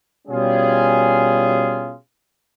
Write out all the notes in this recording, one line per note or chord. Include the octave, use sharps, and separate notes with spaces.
B2 G3 C#4 F4 G#4